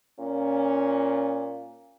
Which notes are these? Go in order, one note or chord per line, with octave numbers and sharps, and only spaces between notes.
A#2 C#4